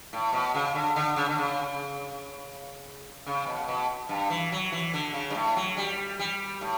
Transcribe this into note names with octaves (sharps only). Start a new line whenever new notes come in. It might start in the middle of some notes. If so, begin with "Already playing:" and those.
A2
B2
C#3
D3
D3
C#3
D3
C#3
C#3
B2
B2
G2
E3
F#3
E3
D3
C#3
G2
A2
F#3
G3
G3
A2